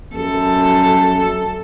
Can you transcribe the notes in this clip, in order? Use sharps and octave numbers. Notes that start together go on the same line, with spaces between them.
F#2 A4